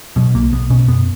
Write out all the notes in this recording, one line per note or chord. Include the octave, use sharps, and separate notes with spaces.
B2 F#3
B1 A#3
B1 B3
B2 C#4
F#2 B3